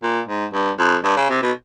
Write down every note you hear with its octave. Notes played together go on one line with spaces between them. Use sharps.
A#2
G#2
G2
F2
G2
C#3
C3
B2